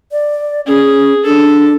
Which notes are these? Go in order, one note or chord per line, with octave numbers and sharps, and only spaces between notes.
D5
C#4 G#4
D4 A4